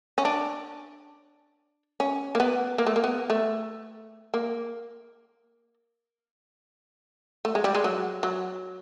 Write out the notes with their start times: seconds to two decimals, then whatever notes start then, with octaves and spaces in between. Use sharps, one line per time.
0.18 C#4
0.25 D4
2.00 C#4
2.35 A#3
2.40 B3
2.78 A#3
2.87 A3
2.96 A#3
3.04 B3
3.30 A3
4.34 A#3
7.45 A3
7.55 G#3
7.64 G3
7.75 G#3
7.84 F#3
8.23 F#3